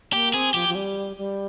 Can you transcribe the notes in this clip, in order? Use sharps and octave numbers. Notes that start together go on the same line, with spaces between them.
A#3 G4
C4 G#4
F3 G4
F3
G3
G3